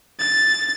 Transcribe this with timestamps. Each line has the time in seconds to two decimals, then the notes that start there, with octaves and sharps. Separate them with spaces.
0.19 A6